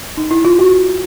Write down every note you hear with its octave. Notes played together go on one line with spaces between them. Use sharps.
D#4
E4
F4
F#4